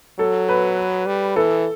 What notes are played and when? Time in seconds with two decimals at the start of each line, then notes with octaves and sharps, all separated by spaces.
0.19 F#3 A4
0.48 B4
1.06 G3
1.36 E3 A4